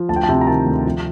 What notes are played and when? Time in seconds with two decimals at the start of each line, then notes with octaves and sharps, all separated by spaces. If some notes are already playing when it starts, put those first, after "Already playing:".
Already playing: F3
0.09 D2 A5
0.16 G5
0.23 A5
0.29 C3
0.41 A#5
0.47 D#3 A5
0.66 D2
0.85 F3